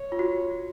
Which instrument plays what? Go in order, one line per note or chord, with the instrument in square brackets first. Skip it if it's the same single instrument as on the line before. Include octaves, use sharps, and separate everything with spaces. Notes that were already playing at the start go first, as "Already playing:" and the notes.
Already playing: [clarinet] C#5
[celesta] F4
F#4